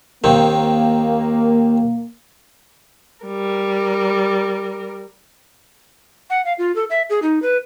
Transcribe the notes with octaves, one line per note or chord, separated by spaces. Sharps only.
D#2 D#3 A#3 C4
G3 A#4
F#5
F5
F4
A4
E5
G#4
D#4
B4